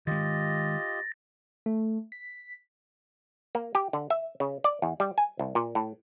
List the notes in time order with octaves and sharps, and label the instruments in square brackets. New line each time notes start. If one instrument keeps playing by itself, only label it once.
[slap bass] D#3 G#3 [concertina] F4 G4 D#5 [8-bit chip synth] A6 A#6
[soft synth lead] A3
B6
[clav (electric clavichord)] A#3
G4
D3
E5
C#3
D5
E2
G3
G#5
C2
A#2
A2